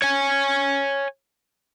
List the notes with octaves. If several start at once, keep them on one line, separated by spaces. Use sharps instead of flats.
C#5 G#5